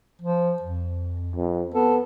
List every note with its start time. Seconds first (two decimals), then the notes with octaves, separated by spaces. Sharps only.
0.22 F3
0.62 F2
1.36 F2
1.74 B3 A4